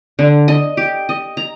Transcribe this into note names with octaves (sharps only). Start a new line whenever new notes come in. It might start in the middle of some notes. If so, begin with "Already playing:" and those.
D3
D#5
G4
D#5
A#5